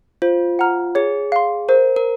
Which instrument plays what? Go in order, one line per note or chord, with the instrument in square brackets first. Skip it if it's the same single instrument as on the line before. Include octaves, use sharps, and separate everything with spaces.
[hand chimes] F4 [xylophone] C5
[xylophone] F#5 A#5 F6
[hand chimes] G#4 [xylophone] C#5
[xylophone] F5 C6
[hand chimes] A#4 [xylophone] C5
[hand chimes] A#4